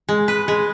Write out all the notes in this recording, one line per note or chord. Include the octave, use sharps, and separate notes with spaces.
G#3
B4
G#3